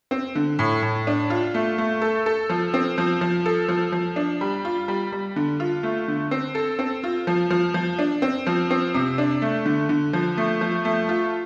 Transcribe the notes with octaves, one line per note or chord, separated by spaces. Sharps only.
C4
D3
A2
A2
D4
F4
A3
A3
A4
A4
F3
C4
F3
F3
A4
F3
F3
D4
G3
F4
G3
G3
D3
F4
A3
D3
C4
A4
C4
F4
F3
F3
F3
D4
C4
F3
C4
C3
D4
A3
D3
D3
F3
A3
F3
A3
F4